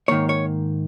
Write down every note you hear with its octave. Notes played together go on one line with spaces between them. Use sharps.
G#2 D#3 A#3 C#5
C#5